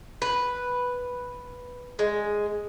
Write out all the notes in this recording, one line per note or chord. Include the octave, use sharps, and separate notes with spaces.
B4
G#3